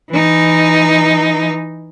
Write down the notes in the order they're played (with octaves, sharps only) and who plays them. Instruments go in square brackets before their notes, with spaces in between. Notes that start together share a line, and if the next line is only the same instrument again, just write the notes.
[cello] E3 D#4